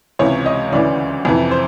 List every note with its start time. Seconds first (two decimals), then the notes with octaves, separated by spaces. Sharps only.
0.19 C#2 C3 E3 C#5
0.46 D#5
0.72 D2 C#3 E3 D5
1.25 F2 C3 E3
1.51 C5